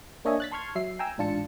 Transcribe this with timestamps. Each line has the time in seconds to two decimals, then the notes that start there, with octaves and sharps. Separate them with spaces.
0.25 A#3 D4 C#5 D#5 E5 G#5
0.40 F#6 A6 B6
0.52 A5 C6 C#6 F6 G#6
0.75 F#3 E5 C7
0.99 G5 G#5 A#5 E6
1.18 A1 G#2 D4 F4 A5 C#7